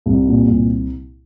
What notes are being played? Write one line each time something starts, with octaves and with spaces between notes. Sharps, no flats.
C2
A#2
C2